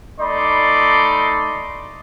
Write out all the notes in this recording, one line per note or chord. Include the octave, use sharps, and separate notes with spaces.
A3 D#4 D5 B5 C6